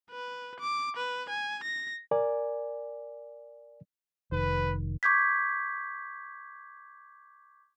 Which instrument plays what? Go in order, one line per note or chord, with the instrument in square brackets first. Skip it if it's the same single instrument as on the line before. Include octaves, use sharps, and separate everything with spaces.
[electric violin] B4
D6
B4
G#5
A#6
[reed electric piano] A#4 D5 G#5
[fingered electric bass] F1 D#3 [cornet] B4
[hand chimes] C#6 D6 G6 G#6 B6